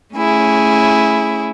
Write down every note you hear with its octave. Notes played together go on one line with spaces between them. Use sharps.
A3 C#4 E4 G#4